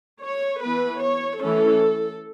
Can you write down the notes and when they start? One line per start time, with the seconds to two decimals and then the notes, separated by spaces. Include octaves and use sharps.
0.22 C#5
0.62 E3 B3 B4
1.02 C#5
1.41 E3 A3 C#4 A4